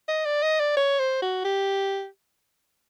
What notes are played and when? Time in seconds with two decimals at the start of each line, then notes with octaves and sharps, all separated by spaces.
0.08 D#5
0.25 D5
0.42 D#5
0.59 D5
0.76 C#5
0.99 C5
1.22 F#4
1.45 G4